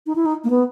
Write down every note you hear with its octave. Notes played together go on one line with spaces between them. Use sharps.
D#4
E4
D#4
A#3
B3